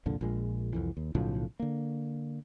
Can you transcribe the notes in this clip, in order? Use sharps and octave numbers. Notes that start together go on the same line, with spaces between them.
C2 F2 A#2 D3
A#1 A#2 G#3
C2 F2 E3
D#2
B1 A2 C#3 F3
D3 A#3